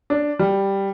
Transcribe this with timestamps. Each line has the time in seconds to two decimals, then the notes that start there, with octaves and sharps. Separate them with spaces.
0.10 D4
0.39 G3